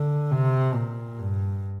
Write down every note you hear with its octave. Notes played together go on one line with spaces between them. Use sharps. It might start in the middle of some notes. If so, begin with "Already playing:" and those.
Already playing: D3
C3
A#2
G2